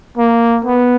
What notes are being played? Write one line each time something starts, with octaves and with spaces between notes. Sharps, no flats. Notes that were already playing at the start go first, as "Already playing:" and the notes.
A#3
B3